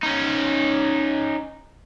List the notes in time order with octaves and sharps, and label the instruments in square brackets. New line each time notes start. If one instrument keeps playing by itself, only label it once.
[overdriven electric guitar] C#4 D#4